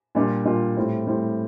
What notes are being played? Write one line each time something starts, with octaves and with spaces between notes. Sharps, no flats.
A#2 G3 D4 F4
A#2 G3 D4 F4
A2 G3 C4
A2 G3 C4